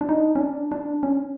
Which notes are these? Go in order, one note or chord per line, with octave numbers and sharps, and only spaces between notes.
D4
D#4
C#4
D4
D4
C#4